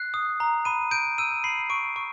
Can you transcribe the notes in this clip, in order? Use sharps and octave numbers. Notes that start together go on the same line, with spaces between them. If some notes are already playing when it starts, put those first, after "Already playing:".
Already playing: F#6 C7
D#6
A#5
B5 D#7
G6 D7
E6 D#7
B5 C7
C#6 D7
C#6